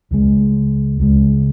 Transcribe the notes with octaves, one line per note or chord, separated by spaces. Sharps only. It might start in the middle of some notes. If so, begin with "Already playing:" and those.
C#2 C#3 F3 G#3
C#2 C#3 F3 G#3